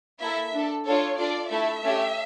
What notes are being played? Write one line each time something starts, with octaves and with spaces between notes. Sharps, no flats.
A#3 E4 A4 E5
D4 A4
D4 F4 A4 C#5
D4 F4 A4 D5
A3 E4 A4 E5
A3 C#4 G4